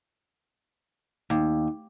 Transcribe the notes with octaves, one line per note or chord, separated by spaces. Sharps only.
D#2